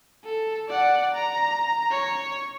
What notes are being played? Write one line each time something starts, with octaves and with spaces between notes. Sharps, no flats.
A4
D5 F#5
A#5
C#5